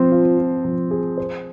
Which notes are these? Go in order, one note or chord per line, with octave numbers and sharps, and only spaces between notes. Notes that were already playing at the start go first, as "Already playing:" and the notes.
Already playing: F3 C4
F4
F4
F3
G#4
C5